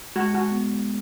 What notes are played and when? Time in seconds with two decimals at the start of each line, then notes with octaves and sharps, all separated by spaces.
0.16 G#3 F#4
0.34 F#4
0.52 B3